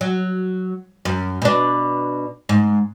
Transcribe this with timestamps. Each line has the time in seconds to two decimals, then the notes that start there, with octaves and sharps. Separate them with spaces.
0.01 F#3
1.05 F#2
1.42 B2 D4
2.49 G#2